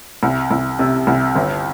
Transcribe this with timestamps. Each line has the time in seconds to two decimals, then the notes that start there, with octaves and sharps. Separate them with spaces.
0.23 C2
0.51 C2
0.79 C3
1.07 C2
1.36 G1